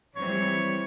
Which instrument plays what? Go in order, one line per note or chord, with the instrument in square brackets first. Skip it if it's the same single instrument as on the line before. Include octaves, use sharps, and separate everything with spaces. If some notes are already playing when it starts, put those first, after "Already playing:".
[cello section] E3 G3 C4 [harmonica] C#5